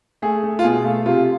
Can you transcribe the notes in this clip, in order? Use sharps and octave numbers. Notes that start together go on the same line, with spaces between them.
A3 G#4
A3
F4
B2 G#4
A3
C3 F4